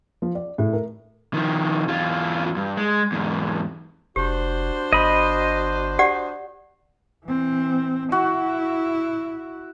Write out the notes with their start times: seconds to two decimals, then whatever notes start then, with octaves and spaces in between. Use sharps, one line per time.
0.22 F3
0.35 D5
0.58 A2
0.73 A#4
1.34 D#3 F3
1.88 E2 F4
2.56 G2
2.77 G#3
3.12 E2 G#2
4.16 F1 D4 F#4 G4 C5
4.93 G1 D#5 B5
5.99 G4 D5 F#5
7.25 E3 C4
8.12 E4 F#4